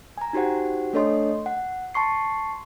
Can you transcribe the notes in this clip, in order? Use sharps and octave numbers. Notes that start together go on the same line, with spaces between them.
G#5 A#5
D#4 F#4 G4 C5 F#5
A3 D4 A4 C#5 D#5 C6
F#5
A5 C6 C#6 C7